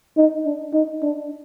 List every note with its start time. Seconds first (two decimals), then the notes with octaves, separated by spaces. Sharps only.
0.17 D#4
0.45 D4
0.73 D#4
1.02 D4